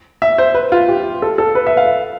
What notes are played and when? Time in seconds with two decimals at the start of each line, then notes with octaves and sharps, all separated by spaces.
0.22 E5
0.38 C5
0.54 B4
0.72 F4
0.89 G4
1.22 A4
1.38 A4
1.55 B4
1.67 E5
1.77 F5